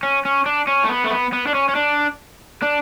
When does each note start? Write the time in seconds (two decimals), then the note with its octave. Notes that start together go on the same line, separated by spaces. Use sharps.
0.03 C#4
0.25 C#4
0.46 D4
0.67 C#4
0.84 A3
0.89 B3
1.04 A3
1.11 B3
1.33 B3
1.47 D4
1.55 C#4
1.69 C#4
1.75 D4
2.62 D4